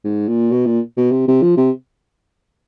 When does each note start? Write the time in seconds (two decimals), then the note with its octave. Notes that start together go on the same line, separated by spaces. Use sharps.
0.04 G#2
0.28 A#2
0.51 B2
0.66 A#2
0.97 B2
1.11 C3
1.27 C3
1.42 F3
1.57 C3